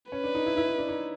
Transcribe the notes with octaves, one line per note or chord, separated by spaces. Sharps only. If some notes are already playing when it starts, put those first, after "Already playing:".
C#4 B4
D4
D#4
E4
E4
D#4
D4
D#4